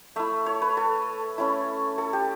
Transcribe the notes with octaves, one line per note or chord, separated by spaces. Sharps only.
A3 E4 E5
C#5
B4
A4
A3 C#4 E4
A4
G4